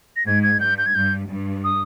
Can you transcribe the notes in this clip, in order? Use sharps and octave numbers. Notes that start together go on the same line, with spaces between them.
A#6
G#2 G#6
G#6
G2 G6
G6
G#6
G2 G6
G2
D#6